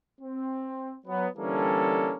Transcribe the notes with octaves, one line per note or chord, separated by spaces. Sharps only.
C4
F#3 B3
D3 E3 G3 A#3 C#4 A4